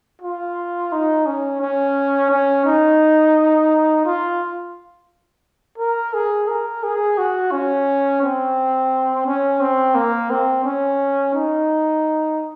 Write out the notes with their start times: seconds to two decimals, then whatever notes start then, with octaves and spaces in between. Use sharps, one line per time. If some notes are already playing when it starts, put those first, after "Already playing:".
0.21 F4
0.92 D#4
1.26 C#4
1.61 C#4
2.30 C#4
2.65 D#4
4.05 F4
5.78 A#4
6.14 G#4
6.48 A#4
6.83 G#4
7.18 F#4
7.52 C#4
8.22 C4
9.26 C#4
9.60 C4
9.95 A#3
10.30 C4
10.65 C#4
11.34 D#4